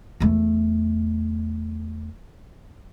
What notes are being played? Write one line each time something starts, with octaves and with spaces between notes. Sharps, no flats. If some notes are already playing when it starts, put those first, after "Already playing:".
E2 A3